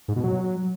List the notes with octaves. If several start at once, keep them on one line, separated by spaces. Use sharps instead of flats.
G#2
B2
F#3